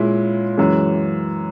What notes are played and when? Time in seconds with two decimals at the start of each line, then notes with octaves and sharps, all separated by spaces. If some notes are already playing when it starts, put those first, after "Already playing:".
Already playing: A#2 G#3 C#4 E4
0.58 F#2 E3 G#3